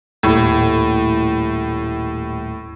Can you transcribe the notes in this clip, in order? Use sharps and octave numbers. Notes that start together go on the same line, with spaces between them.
D#1 A2